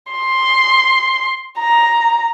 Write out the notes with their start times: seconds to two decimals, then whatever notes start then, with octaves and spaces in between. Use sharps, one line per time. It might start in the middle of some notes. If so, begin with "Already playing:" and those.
0.13 C6
1.59 A#5